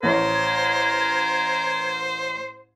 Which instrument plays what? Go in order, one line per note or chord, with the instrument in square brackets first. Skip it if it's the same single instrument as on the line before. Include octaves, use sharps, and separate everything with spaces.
[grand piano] A1 C#5 [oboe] A#4 [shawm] C5 [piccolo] G#6